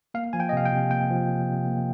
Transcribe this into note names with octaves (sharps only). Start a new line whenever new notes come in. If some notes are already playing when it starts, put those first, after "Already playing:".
A#3 F5
F3 G#5
G5
D#5
C3 F5
G5
C3
A#3 G5
F3
C3
C3
A#3